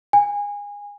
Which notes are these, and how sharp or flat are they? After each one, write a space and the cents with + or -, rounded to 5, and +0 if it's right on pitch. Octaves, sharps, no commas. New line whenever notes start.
G#5 -25